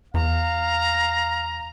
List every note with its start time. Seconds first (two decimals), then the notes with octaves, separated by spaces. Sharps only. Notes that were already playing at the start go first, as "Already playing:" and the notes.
0.14 E2 F5 A#5